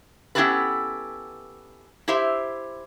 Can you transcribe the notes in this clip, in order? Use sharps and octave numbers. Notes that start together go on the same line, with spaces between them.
B3 C#4 E4 G4 A4 B4
E4 G4 C5 E5